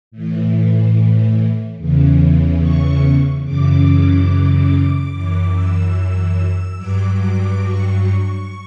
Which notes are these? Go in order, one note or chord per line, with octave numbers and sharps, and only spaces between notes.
A2 E3
E2 C#3 E3
C#6
F#2 C#3 E3 D6
F#2 E3 D6
E6
G2 F#3 D6
D6
C#6